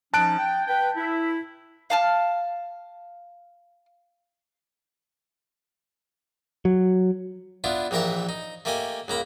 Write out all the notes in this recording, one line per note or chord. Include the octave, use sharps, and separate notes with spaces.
F3 C#4 D#4 A5 F#6 D7
G5
B4 G5
E4
F5 A5 F6
F#3
B3 D4 E4 F4
A#1 E3 G4 A#4 E5 A5
D#4
A3 A#3 G4 D#5 G#5
C#2 A#3 A#5 B5